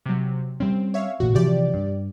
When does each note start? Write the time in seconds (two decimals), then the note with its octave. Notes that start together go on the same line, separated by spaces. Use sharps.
0.06 C3 F#3
0.60 G3 C4 C#4
0.94 C#5 E5 F5
1.20 A1 A#2 F#4
1.35 C3 E3 F3 G4 D5
1.74 G2